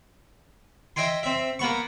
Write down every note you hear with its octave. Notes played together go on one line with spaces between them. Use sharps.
D#5 E5 G5 G#5 C6
C4 E5
A#3 B3 C#6